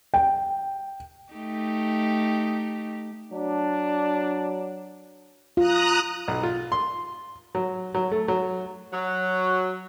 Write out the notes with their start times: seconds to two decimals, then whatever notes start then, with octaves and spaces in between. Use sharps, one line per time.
0.14 G5
1.33 A3 D#4 G4
3.32 F#3 D4
5.57 F4 A#5 D#6 F#6
6.28 B1
6.43 F4
6.72 C6
7.55 F#3
7.95 F#3
8.11 A3
8.28 F#3
8.93 F#3